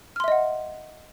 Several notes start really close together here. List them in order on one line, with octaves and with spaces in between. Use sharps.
F6 C6 E5 D#5 F#5